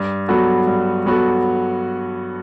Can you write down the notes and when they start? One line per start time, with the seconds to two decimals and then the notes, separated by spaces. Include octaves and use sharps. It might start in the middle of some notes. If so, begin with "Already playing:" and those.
Already playing: G2
0.28 F#3 B3 F#4 A4
0.67 G2
1.06 F#3 B3 F#4 A4